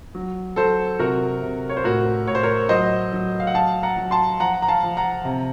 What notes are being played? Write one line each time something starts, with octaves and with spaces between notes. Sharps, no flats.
F#3
F#3 A4 C5
C3 F#4 A#4
C3
C#5
C5
A2 F#4 A#4
A2 C#5
C5
A#4 C#5
F#3 C5 D#5
F#3
F5
F#5
F#3 F5 A5
F#5 A#5
F#3
A5 C6
F3 F#5 A#5
A#5
F5 A5
F3
F#5 A#5
C3